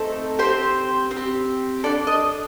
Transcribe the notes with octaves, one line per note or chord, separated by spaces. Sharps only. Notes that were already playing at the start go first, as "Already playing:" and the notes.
Already playing: A3 C4 D#4 A4
C4 G4 C5
C4
G4
D4 A4 D5
D#5